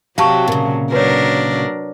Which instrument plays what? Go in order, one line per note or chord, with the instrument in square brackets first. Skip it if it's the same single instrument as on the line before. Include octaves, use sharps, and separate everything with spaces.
[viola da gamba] C3 F#3 [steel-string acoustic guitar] F#4 G4 [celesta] F5 A5 C#6
[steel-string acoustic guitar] A#2 C#3
[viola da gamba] F#3 D4 A#4 [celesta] B4 C#5